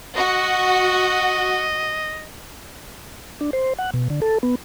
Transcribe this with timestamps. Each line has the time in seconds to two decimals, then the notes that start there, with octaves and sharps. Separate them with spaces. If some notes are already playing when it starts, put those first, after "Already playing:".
0.17 F#4 D#5
3.41 D4
3.53 C5
3.79 F#5
3.94 B2
4.10 D3
4.22 A4
4.43 B3